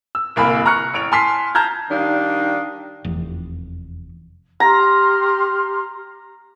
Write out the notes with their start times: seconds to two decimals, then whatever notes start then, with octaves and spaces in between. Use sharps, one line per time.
0.15 E6
0.36 D1 C2 A#3 G#5 B5
0.66 A#5 C#6 F6 F#6 C#7
0.94 A1 C#5 D7 F7
1.12 G#5 A5 C6 F6 B6 C7
1.55 A5 A#5 F6 G6 G#6
1.91 D#3 G3 D4 D#4 F5
3.04 F1 E2
4.60 G4 A#5 C6 F6